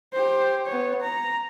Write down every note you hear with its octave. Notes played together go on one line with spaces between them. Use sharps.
G4 C5
B3 C#5
A#5